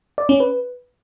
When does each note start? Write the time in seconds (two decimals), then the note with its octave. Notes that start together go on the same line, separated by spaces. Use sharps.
0.18 D5
0.29 C#4
0.40 B4